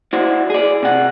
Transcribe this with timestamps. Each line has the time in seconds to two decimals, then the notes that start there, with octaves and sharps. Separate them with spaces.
0.13 E4 F#4 C5 D5
0.50 G#4 D5
0.83 C3 F#5